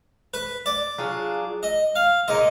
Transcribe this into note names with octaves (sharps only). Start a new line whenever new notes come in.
B4
D5
F#3 D4 F4 G#4
D#5
F5
A#2 G#3 D#4 D#5